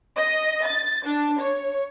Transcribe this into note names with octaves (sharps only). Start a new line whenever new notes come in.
D#5
A6
D4
C#5